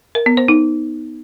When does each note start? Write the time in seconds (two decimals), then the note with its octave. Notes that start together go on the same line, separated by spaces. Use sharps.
0.15 A#4
0.26 B3
0.37 C5
0.48 D#4